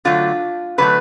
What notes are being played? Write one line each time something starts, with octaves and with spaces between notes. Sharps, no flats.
D3 F#3 A3 F4
D3 F#3 A3 B4